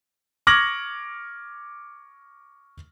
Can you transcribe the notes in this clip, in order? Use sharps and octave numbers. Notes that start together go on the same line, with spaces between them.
C#6 D6 F6 G#6 A#6 F#7